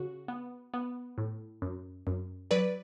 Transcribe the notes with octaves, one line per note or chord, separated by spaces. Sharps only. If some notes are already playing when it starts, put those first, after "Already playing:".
Already playing: C#3 F#4
B3
B3
A2
F#2
F#2
F#3 B4 D5